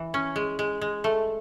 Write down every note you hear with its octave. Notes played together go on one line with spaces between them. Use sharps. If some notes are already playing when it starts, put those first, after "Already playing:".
Already playing: E3
C#4
G#3
G#3
G#3
A3